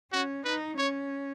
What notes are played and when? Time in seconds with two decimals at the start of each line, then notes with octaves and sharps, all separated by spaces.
0.12 C#4 F#4
0.45 D#4 B4
0.78 C#4 C#5